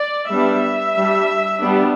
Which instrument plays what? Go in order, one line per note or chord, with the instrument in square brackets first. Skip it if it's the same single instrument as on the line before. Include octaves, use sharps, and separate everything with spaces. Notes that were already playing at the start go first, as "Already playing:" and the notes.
Already playing: [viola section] D5
G3 B3 D4 E5
G3 D4
G3 B3 D4